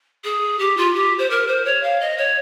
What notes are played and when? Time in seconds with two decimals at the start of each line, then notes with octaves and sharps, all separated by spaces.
0.24 G#4
0.59 G4
0.77 F4
0.94 G4
1.18 C5
1.30 A#4
1.47 C5
1.65 C#5
1.83 F5
2.00 D#5
2.17 C#5